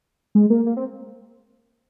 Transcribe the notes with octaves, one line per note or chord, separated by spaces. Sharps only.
G#3
A#3
A#3
C4